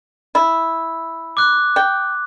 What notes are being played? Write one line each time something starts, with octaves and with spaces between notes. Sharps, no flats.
E4
D6 F#6
G5